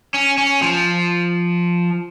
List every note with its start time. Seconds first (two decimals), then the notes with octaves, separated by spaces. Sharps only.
0.14 C#4
0.38 C#4
0.62 F3